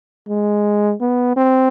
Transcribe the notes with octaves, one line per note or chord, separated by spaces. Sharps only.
G#3
B3
C4